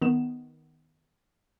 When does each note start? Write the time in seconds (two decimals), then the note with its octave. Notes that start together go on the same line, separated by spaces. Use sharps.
0.01 D#3 B3 E7